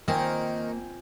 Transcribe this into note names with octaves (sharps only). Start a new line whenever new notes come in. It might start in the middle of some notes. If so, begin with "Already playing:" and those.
D#3 F3 A#3 C4 D5 G5 G#5